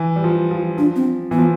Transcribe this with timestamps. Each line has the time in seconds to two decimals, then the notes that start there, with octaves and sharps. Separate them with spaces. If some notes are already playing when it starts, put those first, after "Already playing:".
Already playing: E3
0.16 G3
0.24 F3
0.51 F3
0.78 F3 D4
0.96 C4
1.31 E3 B3
1.39 F3